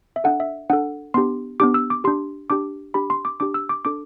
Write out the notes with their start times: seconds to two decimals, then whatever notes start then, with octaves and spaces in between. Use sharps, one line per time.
0.16 E5
0.24 D4 A4 F#5
0.40 E5
0.70 D4 A4 F#5
1.14 B3 D4 G4 C6
1.60 B3 D4 G4 D6
1.74 E6
1.90 D6
2.04 D4 G4 C6
2.50 D4 G4 D6
2.94 D4 G4 B5
3.10 C6
3.25 D6
3.40 D4 G4 D6
3.54 E6
3.69 D6
3.85 D4 A4 D6